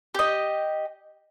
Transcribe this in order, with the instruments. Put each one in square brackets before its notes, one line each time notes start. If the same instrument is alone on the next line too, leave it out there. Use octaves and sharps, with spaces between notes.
[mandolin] G4 D#5